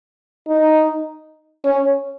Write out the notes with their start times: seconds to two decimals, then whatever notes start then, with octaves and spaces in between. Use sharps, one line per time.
0.48 D#4
1.65 C#4